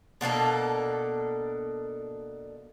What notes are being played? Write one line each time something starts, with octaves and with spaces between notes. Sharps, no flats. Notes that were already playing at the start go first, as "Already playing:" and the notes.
B2 A#3 D4 A4